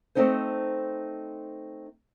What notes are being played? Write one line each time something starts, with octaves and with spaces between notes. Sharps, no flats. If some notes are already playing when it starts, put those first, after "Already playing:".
A3 B3 C4 D#4 A4 C5